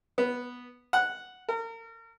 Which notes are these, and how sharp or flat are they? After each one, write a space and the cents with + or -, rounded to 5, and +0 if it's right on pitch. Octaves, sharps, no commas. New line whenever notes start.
B3 -5
F#5 -5
A#4 -35